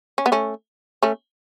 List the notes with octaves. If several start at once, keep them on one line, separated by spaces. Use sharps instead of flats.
C#4
B3
A3 C#4
A3 C#4